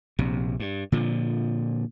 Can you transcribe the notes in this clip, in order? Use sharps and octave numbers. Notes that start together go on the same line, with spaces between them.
A#1 C3
G2
A#2 D3 F3